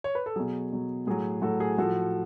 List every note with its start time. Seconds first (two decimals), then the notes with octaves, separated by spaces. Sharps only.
0.04 C#5
0.15 B4
0.26 A4
0.36 B2 F#3 G#4
0.72 B2 F#3
1.07 A2 F#3 G#4
1.42 A2 F#3 F#4 A4
1.60 G#4
1.78 A2 F3 F#4 A4